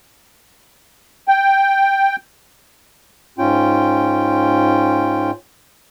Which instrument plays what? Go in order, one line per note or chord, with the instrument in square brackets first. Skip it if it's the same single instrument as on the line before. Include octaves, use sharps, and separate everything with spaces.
[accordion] G5
[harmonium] G#2 C#4 F4 G5